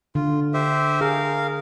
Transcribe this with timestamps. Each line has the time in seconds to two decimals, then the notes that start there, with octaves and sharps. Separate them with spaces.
0.15 D3 F4
0.54 G4 C5 E5
1.01 G#4 A#4 F5